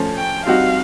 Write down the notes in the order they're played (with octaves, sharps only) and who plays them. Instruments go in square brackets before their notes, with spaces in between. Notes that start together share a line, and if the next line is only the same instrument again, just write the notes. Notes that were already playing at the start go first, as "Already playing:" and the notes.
Already playing: [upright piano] F3 A3 C#4
[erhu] G5
[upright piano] G3 C4 D#4 F#4 [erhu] F5